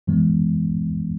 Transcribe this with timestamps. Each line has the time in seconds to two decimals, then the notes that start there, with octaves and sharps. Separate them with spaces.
0.07 F#2 E3 G#3 B3